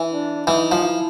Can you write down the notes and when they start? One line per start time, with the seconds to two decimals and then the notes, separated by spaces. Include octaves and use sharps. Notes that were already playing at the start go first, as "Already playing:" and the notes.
Already playing: E3
0.11 D4
0.47 E3 D#4
0.72 F3
0.83 E4